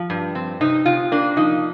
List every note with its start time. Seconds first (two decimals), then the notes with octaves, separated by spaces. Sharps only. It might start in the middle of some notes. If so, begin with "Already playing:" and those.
Already playing: F3
0.10 G2
0.35 C4
0.61 C3 D#4
0.86 C3 F4
1.12 A#3 D4
1.37 F3 D#4